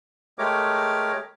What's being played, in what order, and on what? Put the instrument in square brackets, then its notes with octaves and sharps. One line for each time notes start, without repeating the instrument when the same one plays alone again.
[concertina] G#3 A3 G4 A#4 C#5 D6